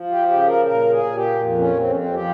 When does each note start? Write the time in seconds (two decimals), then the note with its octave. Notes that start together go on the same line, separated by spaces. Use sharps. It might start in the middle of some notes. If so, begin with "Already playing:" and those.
Already playing: F3
0.10 G4
0.28 C#3 G4
0.47 A#4
0.65 A#2 A#4
0.90 G#4
1.03 A#2
1.15 G4
1.40 F2
1.58 C#4
1.77 F2 C4
1.90 C#4
1.95 C4
2.14 F3 G4